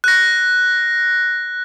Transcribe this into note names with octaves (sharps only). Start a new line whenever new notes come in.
F#6 A#6